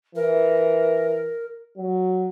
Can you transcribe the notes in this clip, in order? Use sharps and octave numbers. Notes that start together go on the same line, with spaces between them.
E3 A#4
F#3